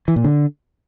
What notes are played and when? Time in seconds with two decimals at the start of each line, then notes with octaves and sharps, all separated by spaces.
0.08 E3
0.16 A#2
0.24 D3